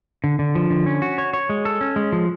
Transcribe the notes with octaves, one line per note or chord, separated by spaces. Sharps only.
D3
D3
F3
D3
C#4
F#4
C#5
C#5
G#3
A4
C#4
G#3
F3